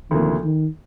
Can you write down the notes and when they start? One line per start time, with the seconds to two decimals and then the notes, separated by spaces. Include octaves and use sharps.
0.11 D2 C3 D#3 F3 A#3
0.44 D#3